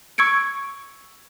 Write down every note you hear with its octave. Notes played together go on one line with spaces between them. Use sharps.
C#6 E6 G#6 C#7 D7